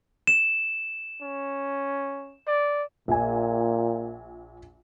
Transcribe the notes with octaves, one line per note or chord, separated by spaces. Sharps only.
E7
C#4
D5
A#1 A#2 G#5